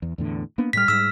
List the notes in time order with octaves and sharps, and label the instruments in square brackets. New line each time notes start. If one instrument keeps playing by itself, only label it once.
[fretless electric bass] E2
E2 A2 D3
A#3 B3 D4
[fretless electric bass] A2 G3 [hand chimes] F6 B6
[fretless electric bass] G#2 G3 [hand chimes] E6 B6